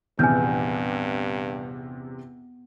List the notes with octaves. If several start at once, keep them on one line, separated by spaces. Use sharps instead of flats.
A#1 E2 G2 C3 B3 G#5 F6 G6